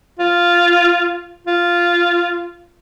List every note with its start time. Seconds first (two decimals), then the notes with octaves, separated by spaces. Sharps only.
0.19 F4
1.47 F4